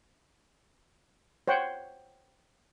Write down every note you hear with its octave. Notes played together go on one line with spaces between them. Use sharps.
C5 C#5 F#5 G5